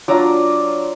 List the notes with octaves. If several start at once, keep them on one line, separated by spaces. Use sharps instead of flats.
F#3 D4 F4 A#5 D6